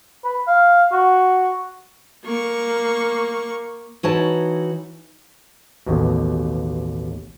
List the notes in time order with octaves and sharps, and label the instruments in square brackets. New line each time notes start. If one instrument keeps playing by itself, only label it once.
[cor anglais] B4
F5
F#4
[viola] A#3 C#6
[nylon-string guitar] E3 D#4 F#4 B4 C#5 A5
[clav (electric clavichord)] A1 D#2 B2